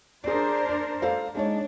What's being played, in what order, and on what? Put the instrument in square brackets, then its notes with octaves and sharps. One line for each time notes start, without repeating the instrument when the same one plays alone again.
[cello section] D4 A#4 C5 [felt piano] G#4 D5
[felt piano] D5
A4 C5 F5
[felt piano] G#3 D#4 C#5 [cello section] D4